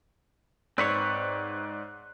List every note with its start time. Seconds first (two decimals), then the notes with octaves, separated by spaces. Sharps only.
0.78 G#2 C4 B4 C#5 D5 F#6